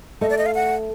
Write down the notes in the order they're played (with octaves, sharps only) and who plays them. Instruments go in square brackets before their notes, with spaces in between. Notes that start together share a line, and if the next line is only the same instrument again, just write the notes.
[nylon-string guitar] A3 [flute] D#5
[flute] D5
D#5
F5
F#5